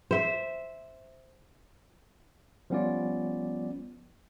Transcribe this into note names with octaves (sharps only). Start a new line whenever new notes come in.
C5 E5
F3 G3 B3 C#4 F4 D5